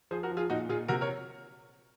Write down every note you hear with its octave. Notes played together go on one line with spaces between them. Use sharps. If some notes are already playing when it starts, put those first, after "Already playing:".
F3 G#4 C5
F#4 A#4
F3
F4 G#4
A#2 D#4 F#4
A#2 F4 G#4
C3 F#4 A#4
A#4 C#5